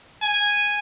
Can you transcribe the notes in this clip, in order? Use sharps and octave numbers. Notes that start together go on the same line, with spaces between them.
G#5